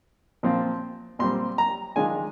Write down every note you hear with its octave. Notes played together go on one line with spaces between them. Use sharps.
A#2 F3 C4 F4
A#2 G3 C4 C6
A#5
D#3 G#3 D4 F4 G#5